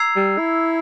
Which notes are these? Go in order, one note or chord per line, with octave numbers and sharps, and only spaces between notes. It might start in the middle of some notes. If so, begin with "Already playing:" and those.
Already playing: A#5 E6 G#6 C7 F7
G3
E4